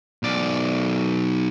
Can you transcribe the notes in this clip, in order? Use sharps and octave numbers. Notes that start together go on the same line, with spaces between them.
B1 D5